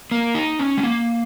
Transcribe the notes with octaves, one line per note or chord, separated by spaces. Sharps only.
A#3
D#4
C#4
G#3
A#3